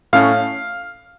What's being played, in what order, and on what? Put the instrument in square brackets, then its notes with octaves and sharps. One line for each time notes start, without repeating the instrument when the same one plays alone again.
[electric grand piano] A2 A3 C#4 F5